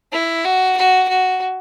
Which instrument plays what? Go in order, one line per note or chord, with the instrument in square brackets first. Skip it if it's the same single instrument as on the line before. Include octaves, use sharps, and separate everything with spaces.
[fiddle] E4
F#4
F#4
F#4